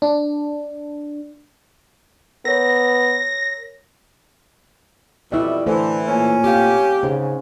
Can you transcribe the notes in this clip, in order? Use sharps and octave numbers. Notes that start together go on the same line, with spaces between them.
D4
B3 A#4 C#5 A#6
F2 B2 G3 E4 D5 E5
D3 E3 A3 A4 C5
A#2 C#4
C4 G4 F5
G#2 C#3 C#4